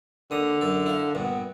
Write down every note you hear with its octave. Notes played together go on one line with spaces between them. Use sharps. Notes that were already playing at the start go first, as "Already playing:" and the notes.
D#2 D3 D#6
F#2 A4
E4 F5
A#1 G2 B3